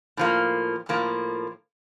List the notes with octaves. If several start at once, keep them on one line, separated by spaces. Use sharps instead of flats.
A2 F3 A#3
A2 F3 A#3